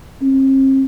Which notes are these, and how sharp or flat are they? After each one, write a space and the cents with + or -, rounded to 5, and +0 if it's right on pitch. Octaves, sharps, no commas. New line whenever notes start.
C4 +40